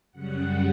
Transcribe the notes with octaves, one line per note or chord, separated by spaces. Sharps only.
F#2 C#3 G3 F#5